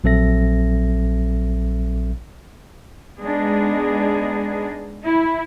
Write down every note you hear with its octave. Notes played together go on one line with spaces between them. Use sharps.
A#1 F#3 C4 A4 E5 A#6
G#3 B3 D4 D#4 G#4
E4